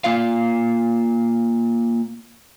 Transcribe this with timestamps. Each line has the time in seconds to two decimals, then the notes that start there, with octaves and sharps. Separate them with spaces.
0.04 A#3 F4 F5